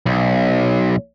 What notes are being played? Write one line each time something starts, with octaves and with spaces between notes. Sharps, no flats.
B1